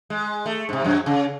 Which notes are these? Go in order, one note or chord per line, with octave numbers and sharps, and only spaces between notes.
G#3
A3
G#2 C3
F#2 F#3
C#3